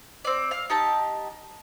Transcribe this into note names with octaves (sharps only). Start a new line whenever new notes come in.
C4 D5
F5
D#4 G4 A5